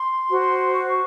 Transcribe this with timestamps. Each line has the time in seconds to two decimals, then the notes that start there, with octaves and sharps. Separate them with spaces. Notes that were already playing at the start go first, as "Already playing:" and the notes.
Already playing: C6
0.29 F#4 C5
0.73 C#6